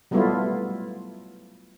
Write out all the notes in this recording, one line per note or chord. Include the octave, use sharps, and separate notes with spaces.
F#3 G3 A3 B3 E4 F4